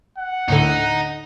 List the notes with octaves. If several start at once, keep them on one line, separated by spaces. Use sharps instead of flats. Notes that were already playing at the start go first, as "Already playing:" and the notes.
F#5
D2 A2 D3 D#4